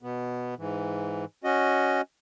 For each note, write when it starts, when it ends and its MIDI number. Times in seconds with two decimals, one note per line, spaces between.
0.03 0.55 47
0.03 0.55 59
0.58 1.25 44
0.58 1.25 52
1.44 2.01 61
1.44 2.01 66
1.44 2.01 75